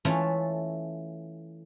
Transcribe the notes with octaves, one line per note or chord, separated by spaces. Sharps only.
E3 A3 C#4 E4 F4 A4